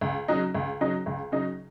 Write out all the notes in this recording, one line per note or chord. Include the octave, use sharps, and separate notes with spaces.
C#2
C#3 F#3 D#4
C#2
C#3 F#3 D#4
C#2
C#3 F#3 D#4